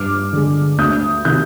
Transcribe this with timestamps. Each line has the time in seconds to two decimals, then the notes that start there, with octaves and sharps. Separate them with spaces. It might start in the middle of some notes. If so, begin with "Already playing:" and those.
Already playing: G2 D6 F6
0.33 D3 G#3
0.78 D2 D#6 G6
1.25 C3 D#3 D#6 G6